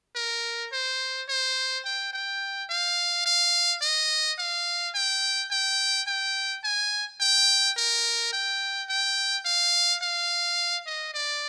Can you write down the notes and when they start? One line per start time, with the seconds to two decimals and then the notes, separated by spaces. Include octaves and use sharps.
0.16 A#4
0.72 C5
1.29 C5
1.85 G5
2.13 G5
2.70 F5
3.26 F5
3.82 D#5
4.38 F5
4.95 G5
5.51 G5
6.07 G5
6.64 G#5
7.21 G5
7.77 A#4
8.33 G5
8.89 G5
9.45 F5
10.02 F5
10.86 D#5
11.14 D5